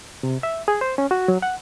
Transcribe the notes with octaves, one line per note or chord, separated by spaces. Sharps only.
C3
E5
G#4
C5
C#4
F#4
F#3
F#5